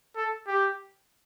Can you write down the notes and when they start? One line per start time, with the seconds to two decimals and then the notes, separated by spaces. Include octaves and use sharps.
0.16 A4
0.47 G4